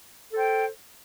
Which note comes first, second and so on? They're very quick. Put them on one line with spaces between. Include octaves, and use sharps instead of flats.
A4 C5 G5